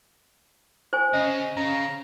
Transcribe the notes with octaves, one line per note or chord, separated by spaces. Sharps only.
C5 G#5
C#3 D#5
C#3 A#5